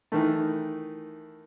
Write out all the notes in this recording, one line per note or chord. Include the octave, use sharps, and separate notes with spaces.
D#3 E3 A3